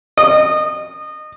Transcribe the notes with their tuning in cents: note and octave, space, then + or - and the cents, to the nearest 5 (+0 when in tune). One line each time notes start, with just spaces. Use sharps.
D#5 -25